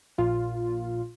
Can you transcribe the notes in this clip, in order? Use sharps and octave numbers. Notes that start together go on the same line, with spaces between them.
A#1 A#2 F4